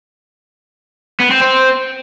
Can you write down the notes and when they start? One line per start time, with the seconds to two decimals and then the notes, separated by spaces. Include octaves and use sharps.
1.20 B3
1.31 C4
1.41 C4